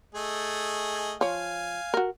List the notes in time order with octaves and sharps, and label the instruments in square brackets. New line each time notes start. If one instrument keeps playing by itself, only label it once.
[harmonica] A3 G#4 D#5
[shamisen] F3 C#5 [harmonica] F5 G#5
[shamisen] F#4 A#4